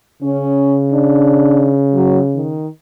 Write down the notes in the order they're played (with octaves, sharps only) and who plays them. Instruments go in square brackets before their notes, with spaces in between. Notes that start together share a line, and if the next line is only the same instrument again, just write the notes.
[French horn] C#3 [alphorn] C#4
[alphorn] D4
F#3
D#3